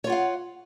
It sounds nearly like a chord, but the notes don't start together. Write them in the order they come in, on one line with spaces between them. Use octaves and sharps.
C#5 F4 F#5 F5